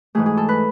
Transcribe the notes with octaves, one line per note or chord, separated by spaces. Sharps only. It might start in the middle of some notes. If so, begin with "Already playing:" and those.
G#2 E3 A3 G#4
G#4
A4
B4